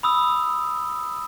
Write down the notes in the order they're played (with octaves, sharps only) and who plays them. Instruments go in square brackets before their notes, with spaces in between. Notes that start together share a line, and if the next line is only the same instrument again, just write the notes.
[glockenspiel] B5 D#6 E6